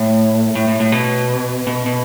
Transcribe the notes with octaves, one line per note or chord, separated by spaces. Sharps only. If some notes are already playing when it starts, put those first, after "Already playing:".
Already playing: A2
A2
A2
A2
B2
B2
B2